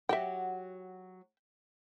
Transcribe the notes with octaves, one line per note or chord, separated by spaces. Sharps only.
F#3 F#4 G4 E5 G5